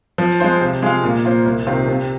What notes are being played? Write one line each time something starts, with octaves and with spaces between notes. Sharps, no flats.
F3
G#3 F4 C5
C3
G#3 F4 G#4 F5
A#2
A#3 F4 C5
C2
C3 D#3 C4 F4
C3